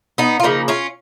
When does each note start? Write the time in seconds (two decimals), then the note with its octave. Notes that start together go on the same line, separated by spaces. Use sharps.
0.18 B3 D#4
0.40 F4
0.43 C#3 F3 A#3 D#4
0.68 C#4 F4